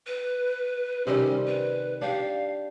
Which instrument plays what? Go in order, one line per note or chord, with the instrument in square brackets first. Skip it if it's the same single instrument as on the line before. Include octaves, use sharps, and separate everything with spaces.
[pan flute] B4
[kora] C3 D#3 G3 [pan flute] C#4
[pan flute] B4
[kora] D4 G4 [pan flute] F5